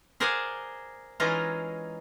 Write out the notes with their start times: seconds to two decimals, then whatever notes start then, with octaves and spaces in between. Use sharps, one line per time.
0.20 G#4 A#4 C5 D5 F#5 G#5
1.20 E3 G#3 C#4 D#4 F4 A#5